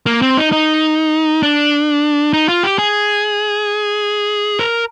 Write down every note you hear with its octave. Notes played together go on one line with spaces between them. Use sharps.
A#3
C4
D#4
D#4
D4
D#4
F4
G4
G#4
A#4